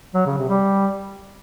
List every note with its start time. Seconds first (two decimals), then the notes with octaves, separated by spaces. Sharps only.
0.14 F#3
0.26 C#3
0.38 C3
0.49 G3